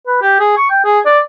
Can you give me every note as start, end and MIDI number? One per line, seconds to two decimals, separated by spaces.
0.07 0.17 71
0.22 0.38 67
0.40 0.55 68
0.57 0.68 85
0.70 0.84 79
0.84 1.00 68
1.06 1.19 74